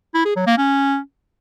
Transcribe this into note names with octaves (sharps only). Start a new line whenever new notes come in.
E4
G#4
F#3
A#3
C#4